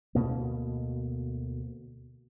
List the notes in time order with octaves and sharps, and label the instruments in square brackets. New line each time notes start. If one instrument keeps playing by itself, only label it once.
[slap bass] D2 B2 A#3